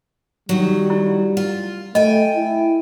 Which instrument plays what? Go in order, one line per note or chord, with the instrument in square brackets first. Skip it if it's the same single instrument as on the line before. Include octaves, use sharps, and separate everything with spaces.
[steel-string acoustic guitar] D#3 F#3 [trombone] G3
[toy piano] E4
[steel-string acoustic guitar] F4
[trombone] A3 [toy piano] D#5 [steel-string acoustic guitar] G5 G#5
[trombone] E4